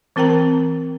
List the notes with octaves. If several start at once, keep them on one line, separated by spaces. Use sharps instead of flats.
E3 C4 A#4 G5 A#5